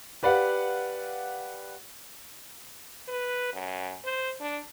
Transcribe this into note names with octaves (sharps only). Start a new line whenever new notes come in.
G4 B4 D5 F5 F#5
B4
F#2
C5
D4